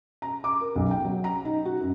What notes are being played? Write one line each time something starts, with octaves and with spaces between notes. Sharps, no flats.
A#5
D6
A#4
B1
G5
F#3
A#5
D#4
F#4
F#2